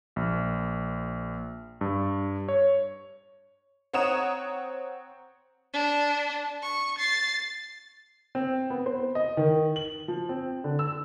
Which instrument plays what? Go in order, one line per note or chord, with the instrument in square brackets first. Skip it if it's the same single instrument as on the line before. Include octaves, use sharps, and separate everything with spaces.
[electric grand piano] A#1
G2
C#5
[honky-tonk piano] C4 C#5 F#5 A#5 D#6 E7
[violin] D4
C#6
A6 C7
[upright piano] C4
B3
C5
D#5
D#3
F#7
F3
C4
D3
E6